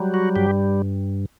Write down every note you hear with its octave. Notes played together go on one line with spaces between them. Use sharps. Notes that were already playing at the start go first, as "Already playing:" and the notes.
Already playing: F#3 G3
F#4
G2 G4